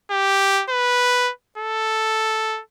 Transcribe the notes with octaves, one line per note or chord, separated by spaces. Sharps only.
G4
B4
A4